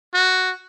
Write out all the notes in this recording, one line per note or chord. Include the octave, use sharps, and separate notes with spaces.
F#4